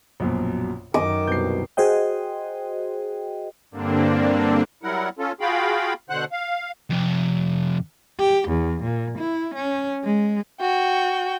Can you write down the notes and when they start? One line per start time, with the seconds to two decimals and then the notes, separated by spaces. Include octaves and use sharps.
0.20 A#1 F#2 B2
0.94 F#2 D#3 D#5 D6
1.27 C2 B2 G6 C7
1.77 F#4 G#4 C5 D#5 G5
3.71 G2 D3 A#3 C4 D4
4.83 F#3 G3 E4 A#4 F#5
5.19 C#4 F4 A4
5.41 F4 F#4 G#4 F5 G5 B5
6.10 B2 D3 C5 F#5 F#6
6.32 F5
6.91 F2 C3
8.20 G4
8.49 E2
8.83 A#2
9.19 E4
9.55 C#4
10.04 G#3
10.61 F#4 G5